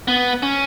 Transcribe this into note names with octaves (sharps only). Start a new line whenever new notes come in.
B3
C#4